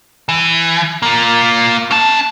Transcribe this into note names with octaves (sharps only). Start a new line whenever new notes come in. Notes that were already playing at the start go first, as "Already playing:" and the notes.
E3
A#3 F4
C#4 A5